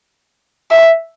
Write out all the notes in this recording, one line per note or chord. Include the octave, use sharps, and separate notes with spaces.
E5